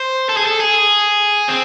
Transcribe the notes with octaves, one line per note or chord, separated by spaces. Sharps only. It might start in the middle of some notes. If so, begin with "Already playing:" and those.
Already playing: C5
A4
G#4
A4
G#4
C4